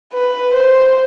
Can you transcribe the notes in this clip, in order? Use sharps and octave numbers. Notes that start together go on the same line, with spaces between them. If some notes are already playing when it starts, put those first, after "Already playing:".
B4
C5